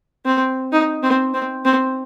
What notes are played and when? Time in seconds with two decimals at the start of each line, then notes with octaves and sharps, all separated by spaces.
0.25 C4
0.72 D#4
1.03 C4
1.34 C4
1.65 C4